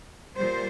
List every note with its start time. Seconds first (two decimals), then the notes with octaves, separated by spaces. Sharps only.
0.36 A#2 G3 C5